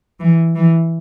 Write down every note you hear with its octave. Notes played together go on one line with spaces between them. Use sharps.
E3
E3